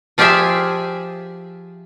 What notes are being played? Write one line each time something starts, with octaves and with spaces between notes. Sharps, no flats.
F3 F4 G4 G#4 E5 G#5